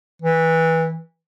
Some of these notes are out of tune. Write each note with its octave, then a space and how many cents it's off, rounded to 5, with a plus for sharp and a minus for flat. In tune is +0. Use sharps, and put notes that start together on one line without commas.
E3 -15